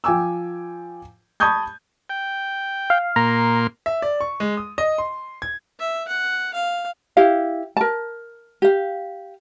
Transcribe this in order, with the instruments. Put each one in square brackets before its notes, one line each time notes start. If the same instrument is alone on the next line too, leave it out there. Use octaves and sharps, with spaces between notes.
[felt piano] F3 G5 G#5 D6 E6
A5 B5 C#6 D#6 G6 G#6
[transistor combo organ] G5
[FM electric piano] F5
[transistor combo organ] A#2 A#3 C6 [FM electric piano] A#5
[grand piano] E5
D5
C#6
G#3
D#6
D#5
C6
G#6
[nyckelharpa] E5
F#5
F5
[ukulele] E4 G4 F5
A#4 A5
G4 F5